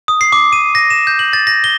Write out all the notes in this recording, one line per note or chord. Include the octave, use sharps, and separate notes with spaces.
D#6
C7
D6
D#7
A#6
E7
G6
F#7
A6
A#6
G7